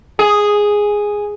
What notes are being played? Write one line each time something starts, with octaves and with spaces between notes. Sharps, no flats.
G#4